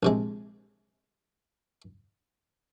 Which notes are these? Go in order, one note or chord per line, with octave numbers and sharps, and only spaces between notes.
A#1 C3 G#3